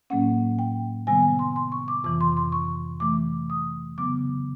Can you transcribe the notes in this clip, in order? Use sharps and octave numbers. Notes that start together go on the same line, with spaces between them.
A2 F#3 A#3 C#4 F#5
G5
C3 D#3 G3 B3 G#5
G#5
C6
C6
C#6
D6
F2 C3 E3 D6
C6
C6
C#6
C3 E3 A3 D6
D#6
C#3 F#3 B3 D6